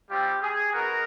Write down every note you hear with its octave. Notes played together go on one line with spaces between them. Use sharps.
G3 C4 F4 G4
G#4
B3 D#4 F#4 A#4